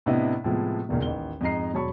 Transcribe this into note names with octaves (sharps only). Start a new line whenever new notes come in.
A2 C3 B3 D4 E4 D#5
A2 C3 F3 G#3 B3
E1 C#2 A#2 D#3
A1 D#2 G7
F2 G#2 D#5 A#5 C7
E1 F#3 C#5 A5 B5 C#6